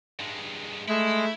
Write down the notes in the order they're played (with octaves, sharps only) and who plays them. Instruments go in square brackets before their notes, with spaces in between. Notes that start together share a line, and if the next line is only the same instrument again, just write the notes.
[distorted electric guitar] G2 G#3
[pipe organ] G#3 [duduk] A3 [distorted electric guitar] E4